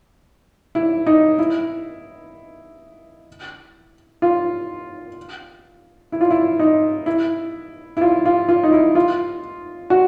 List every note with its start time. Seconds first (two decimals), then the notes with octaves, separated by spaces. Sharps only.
0.75 E4
1.06 D#4
1.39 E4
4.22 F4
6.12 E4
6.21 F4
6.31 E4
6.59 D#4
7.06 E4
7.97 E4
8.01 F4
8.25 F4
8.49 F4
8.63 D#4
8.73 E4
8.95 F4
9.90 F#4